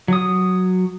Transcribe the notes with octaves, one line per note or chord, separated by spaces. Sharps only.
F#3 D#6